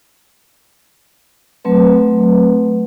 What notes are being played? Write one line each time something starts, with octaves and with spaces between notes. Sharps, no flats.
F#3 A3 C4 B4